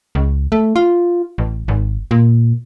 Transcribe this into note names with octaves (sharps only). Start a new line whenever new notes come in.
C#2
A3
F4
A1
G#1
A#2